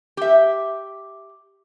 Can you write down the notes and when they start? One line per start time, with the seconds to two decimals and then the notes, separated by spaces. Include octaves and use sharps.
0.17 G4 E5